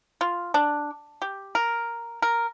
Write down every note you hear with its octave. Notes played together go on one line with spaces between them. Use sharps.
F4
D4
G4
A#4
A#4